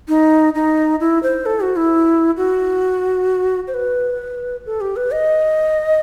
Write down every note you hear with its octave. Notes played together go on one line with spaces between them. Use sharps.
D#4
D#4
E4
C5
A4
F#4
E4
F#4
C5
B4
A4
G4
B4
D#5